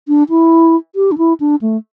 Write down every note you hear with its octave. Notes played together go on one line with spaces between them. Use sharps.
D4
E4
G4
D4
E4
D4
A3